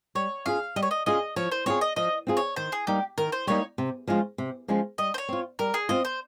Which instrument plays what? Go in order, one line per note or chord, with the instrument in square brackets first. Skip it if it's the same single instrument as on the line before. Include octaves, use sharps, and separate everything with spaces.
[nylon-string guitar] G3 [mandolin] C#5
[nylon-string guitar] C#4 F4 G#4 [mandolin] F5
[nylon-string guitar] G3 [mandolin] D#5
[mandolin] C#5
D#5
[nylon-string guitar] C#4 F4 G#4 [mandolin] D#5
[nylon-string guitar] F3 [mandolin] C#5
[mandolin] C5
[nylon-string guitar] C4 F4 G#4 [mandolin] C#5
[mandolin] D#5
[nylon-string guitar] F3 [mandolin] D#5
[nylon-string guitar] C4 F4 G#4
[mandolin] C#5
[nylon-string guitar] D#3 [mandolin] C5
[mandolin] G#4
[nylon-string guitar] G3 A#3 D#4 [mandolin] G4
[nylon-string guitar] D#3 [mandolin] A#4
[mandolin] C5
[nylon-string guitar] G3 A#3 D#4 [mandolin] C#5
[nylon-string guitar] C3
F3 G#3 C#4 F4
C3
F3 G#3 C#4 F4
[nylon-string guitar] G3 [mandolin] D#5
[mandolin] C5
C#5
[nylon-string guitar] C4 F4
[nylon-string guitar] G3 [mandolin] A#4
[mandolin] G#4
[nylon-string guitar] C4 F4 [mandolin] D#5
[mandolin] C5